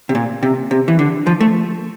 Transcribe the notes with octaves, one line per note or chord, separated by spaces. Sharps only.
C3
A#2
C3
C3
E3
D3
F3
A3